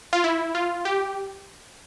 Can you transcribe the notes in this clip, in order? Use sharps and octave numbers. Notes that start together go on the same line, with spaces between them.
F4
E4
F4
G4